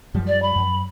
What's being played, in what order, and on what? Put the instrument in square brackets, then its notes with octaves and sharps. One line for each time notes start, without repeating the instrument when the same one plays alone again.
[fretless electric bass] F#2 F3 G3
[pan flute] D5
B5
[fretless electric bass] F#2